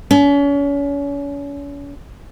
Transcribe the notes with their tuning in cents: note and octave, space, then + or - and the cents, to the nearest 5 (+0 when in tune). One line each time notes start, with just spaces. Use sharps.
C#4 +35